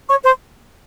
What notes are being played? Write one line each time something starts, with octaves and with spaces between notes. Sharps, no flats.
C#5 C#6
C5 C6